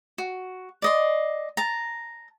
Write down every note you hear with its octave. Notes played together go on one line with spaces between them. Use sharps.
F#4
D5 D#5 C6
A5 A#5